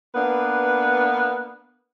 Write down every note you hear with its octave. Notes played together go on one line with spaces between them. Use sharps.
A#3 B3 D4 B4